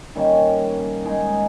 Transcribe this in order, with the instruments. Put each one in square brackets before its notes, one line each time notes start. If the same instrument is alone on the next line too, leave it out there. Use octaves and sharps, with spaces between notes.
[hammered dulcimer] D#3 G3 A#3 C#4
G#3 D#4 G#4